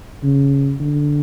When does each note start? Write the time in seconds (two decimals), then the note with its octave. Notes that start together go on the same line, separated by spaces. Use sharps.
0.23 C#3
0.80 D3